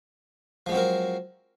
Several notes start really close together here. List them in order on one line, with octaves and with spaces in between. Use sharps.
F3 G#3 F#3 C4 A#4